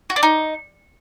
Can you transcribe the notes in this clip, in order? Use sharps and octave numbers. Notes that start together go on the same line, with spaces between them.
F#4
D4
D#4